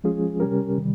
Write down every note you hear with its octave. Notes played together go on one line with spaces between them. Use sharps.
F3 G#3 C#4 F4 G#4
C3 G3 C#4 G4 A#4
C3 D#3 G3